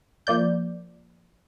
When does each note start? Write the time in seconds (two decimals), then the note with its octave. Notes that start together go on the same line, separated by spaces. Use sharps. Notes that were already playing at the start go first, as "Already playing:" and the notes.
0.27 F3 A#3 D5 G6